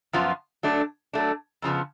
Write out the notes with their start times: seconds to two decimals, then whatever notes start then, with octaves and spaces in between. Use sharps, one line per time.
0.13 F#2 F3 B3 F4
0.63 F#3 A3 D4
1.13 F#3 A3 D4
1.62 F2 C#3 F3 B3